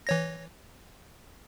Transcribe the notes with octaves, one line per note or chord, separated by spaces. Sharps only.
E3 C#5 A#6